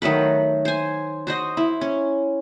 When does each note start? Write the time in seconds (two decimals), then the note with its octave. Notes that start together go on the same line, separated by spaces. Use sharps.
0.02 D#3 F#3 A3 B4
0.65 C5 G#5
1.27 F#4 C5 D#5
1.57 E4
1.81 C#4